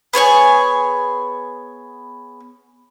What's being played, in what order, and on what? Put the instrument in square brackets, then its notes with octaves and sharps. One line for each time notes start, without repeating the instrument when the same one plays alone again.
[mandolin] B3 G#4 C#5 G#5